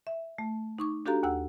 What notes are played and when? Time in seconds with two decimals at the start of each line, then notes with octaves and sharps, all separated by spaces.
0.07 E5
0.38 A3
0.78 D#4 C#6 D6
1.06 D4 F#4 G4 A4 F5 A#5
1.23 D#2 F#5 E6